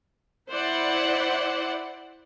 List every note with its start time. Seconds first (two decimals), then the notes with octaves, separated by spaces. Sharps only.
0.50 E4 C5 D5 F#5